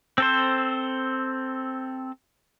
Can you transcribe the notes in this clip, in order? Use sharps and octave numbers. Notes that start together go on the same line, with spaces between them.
C4 A4 C5